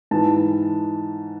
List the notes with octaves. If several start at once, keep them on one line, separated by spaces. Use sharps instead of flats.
G#2 E3 A5